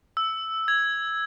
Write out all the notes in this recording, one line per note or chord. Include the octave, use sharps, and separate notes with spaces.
E6
G#6